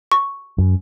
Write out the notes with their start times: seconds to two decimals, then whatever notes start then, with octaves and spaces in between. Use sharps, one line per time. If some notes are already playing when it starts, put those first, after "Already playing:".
0.12 C#6
0.58 F#2